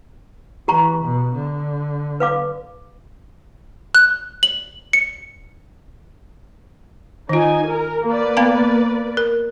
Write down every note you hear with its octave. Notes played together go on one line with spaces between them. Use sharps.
E3 G4 A#5 C#6
B2
D3
B4 F5 D6
F#6
F#7
C#7
D#3 D#4 F4 G#5
A#4
A#3 B4 D5
B3 F5 A5
A#4